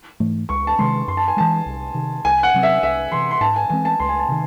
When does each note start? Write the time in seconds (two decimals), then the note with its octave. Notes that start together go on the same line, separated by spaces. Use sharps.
0.20 G#2 E3 A3
0.49 C#2 C#6
0.67 A5
0.79 C3 D#3 G#3 C6
1.08 F#2 C6
1.17 A5
1.28 G#5
1.37 E3 G#3 A5
1.66 C2
1.94 C3 D#3
2.24 C2 G#5
2.43 F#5
2.54 C3 F#3 C4
2.63 E5
2.83 C2 E5
3.12 C3 E3 C6
3.31 C6
3.41 G#2 A5
3.56 G#5
3.70 E3 G#3 C4 G#5
3.85 A5
4.00 C#2 C6
4.09 G#5
4.19 A5
4.28 C3 D#3